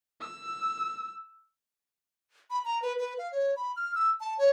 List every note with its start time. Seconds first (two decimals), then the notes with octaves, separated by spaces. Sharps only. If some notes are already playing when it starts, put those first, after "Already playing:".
0.21 E6
2.50 B5
2.65 A#5
2.82 B4
2.98 B4
3.18 F5
3.32 C#5
3.56 B5
3.76 F6
3.95 E6
4.20 A5
4.38 C#5